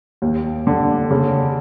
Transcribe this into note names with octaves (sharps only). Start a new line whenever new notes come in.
D#2
D3
C#3